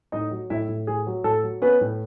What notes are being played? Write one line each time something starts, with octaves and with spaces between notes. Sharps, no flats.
A2 D#4 D#5
F#3
A2 E4 E5
A2
A2 G#4
F#3
A2 A4
F#3
B3 C#4 B4
A2